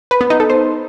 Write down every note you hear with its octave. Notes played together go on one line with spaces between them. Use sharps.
B4
B3
D#4
A4
C5